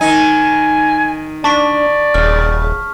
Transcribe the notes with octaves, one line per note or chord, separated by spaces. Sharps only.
D#3 D#4 G#5
D4 D5 A5 C#6 B6
D#1 C#3 F6